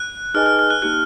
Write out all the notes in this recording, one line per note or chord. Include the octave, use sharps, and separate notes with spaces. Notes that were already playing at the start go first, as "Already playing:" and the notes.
Already playing: F#6
D#4 G#4 B4 D#5 G#5 F6
F6
F6
F#6
A#3 D#4 G4 F#6